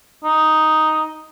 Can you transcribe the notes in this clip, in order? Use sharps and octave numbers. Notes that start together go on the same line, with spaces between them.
D#4